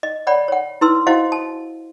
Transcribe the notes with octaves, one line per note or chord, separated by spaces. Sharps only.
D#5
C#5 D5 F#5 B5
C#5 F#5
E4 B4 C6 E6
E4 F#4 C5 D#5 F5 F#5
A5